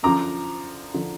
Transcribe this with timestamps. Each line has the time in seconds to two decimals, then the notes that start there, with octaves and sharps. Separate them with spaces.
0.03 F#2 D3 F3 A#5 D6
0.94 D3 F3